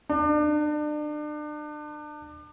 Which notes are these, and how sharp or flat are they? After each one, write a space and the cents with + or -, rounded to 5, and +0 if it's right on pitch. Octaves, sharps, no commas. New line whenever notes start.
D4 +35